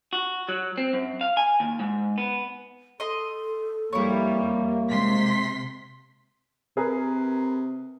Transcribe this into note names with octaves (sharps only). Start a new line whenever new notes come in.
F#4
F#3
C4
F#2
F5
G#5
D#2
G#2
B3
A4 D#5 C6
F2 G3 A#3 E4 C#5
C3 G#3 C6 B6
C3 G#4 A#4 B4